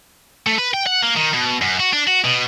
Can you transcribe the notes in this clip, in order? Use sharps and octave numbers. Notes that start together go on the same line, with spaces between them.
A3
B4
G5
F#5
A#3
D#3
B2
F#2
F#4
D4
F#4
B2